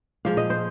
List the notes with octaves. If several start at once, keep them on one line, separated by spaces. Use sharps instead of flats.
A#2 F3 G#3 F5
D#5
C5